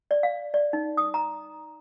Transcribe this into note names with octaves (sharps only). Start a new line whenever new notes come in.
D5
F5
D5
D#4
D#6
A#5